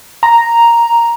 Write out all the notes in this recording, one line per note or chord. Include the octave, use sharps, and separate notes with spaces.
A#5